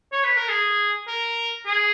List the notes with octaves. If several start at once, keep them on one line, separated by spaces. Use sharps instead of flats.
C#5
B4
A#4
G#4
A#4
G#4